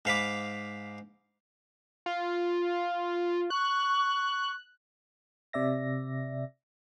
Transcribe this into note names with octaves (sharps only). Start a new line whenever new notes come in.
G#2 F5 B5 D6
F4
C#6 F#6
C3 D5 E5 A#6